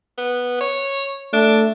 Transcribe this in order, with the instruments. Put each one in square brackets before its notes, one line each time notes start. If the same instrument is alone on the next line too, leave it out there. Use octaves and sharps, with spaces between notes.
[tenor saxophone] B3
C#5
[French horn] A3 [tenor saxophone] D4